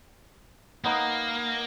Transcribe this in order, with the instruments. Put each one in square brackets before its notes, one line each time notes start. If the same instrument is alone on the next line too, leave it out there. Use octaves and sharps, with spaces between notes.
[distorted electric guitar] A#3 [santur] B3 D#4 D#6